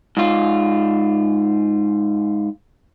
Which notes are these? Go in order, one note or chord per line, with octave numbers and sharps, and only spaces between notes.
G#2 F4